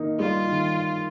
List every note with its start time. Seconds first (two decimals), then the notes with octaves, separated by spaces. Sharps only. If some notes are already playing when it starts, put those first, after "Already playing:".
Already playing: D#3 A#3 D#4
0.19 G3 F4
0.47 D#3